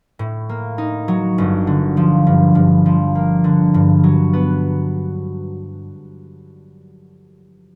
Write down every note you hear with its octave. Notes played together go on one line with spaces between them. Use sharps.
A2
A#3
D#4
F#3
G1
D3
F3
G2
G2
F3
A#3
D3
G2
F#3
B3